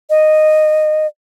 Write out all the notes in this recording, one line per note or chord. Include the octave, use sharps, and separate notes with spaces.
D#5